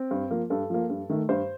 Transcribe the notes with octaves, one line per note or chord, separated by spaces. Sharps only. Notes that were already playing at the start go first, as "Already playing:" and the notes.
Already playing: C4
G2
F3 A#3
G2 A4
F3 A#3
G2
D#3 A3
G2 C5